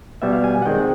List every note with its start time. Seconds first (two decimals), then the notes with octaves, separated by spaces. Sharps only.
0.22 B2 G3 B3 E5
0.33 F5
0.44 G#5
0.62 F#5
0.66 D#3 G#3 C4 G5